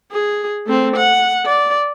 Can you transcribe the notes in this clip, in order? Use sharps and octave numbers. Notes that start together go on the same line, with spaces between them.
G#4
A3 C4
F#5
D5